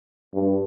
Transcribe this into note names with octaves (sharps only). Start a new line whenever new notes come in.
G2